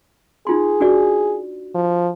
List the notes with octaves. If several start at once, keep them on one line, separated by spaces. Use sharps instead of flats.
D#4 F4 G#4 C6
D4 F#4 D5
F3